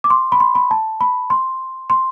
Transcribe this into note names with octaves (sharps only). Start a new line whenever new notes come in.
D6
C6
B5
C6
B5
A5
B5
C6
C6